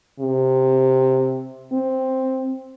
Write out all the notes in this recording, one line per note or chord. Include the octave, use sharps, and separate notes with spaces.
C3
C4